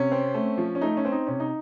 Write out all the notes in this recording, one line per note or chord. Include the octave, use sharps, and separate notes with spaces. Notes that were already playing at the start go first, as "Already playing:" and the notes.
Already playing: C3 C#4
C4
A3
F3
C#4
A3 D#4
C#4
C4
D#4
C3 C#4
D#4